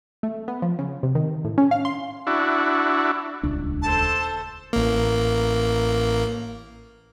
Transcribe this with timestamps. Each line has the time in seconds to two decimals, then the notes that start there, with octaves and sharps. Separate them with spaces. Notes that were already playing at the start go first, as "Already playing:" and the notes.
0.23 A3
0.48 B3
0.62 F3
0.79 C#3
1.03 C3
1.15 D#3
1.45 A2
1.58 C#4
1.71 F5
1.85 C6
2.27 D4 E4 F#4
3.43 D#1 C#2 D4
3.82 A3 A4 C5 A5
4.73 A1 A#3